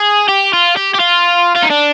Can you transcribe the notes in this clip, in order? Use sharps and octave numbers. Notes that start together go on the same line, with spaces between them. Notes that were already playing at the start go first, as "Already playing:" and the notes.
Already playing: G#4
G4
F4
G4
G4
F4
F4
D#4
D4